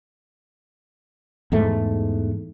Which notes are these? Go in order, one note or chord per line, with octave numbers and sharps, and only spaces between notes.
E2 G#2 A3